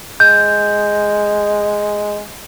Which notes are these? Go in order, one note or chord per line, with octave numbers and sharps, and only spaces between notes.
G#3 G6